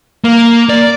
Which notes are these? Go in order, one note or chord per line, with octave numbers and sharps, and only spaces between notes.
A#3
D5